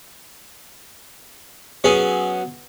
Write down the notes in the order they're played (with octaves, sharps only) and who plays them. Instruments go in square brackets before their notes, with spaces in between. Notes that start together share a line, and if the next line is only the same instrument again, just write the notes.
[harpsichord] F#3 B3 C#4 F#4 G#4